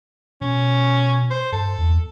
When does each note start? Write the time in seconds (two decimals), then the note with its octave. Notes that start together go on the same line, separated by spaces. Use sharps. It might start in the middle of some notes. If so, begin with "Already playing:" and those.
0.41 B2 C#4
1.31 C5
1.52 G2 A4
1.79 E2